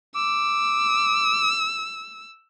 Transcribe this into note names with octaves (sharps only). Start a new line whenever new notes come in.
D6 E6